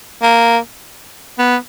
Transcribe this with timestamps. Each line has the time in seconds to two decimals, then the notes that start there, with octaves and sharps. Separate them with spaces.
0.23 A#3
1.39 B3